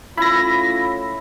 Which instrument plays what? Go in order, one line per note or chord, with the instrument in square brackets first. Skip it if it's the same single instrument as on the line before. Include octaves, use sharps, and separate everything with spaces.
[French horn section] A3 C#4 F4 [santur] E4 [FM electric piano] B5 A#6